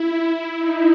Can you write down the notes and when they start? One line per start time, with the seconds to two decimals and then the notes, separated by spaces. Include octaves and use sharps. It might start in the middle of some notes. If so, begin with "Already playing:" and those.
Already playing: E4
0.25 E4
0.56 D#4